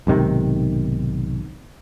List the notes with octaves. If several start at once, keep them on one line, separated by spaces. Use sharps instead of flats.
B1 G#2 C3 D#3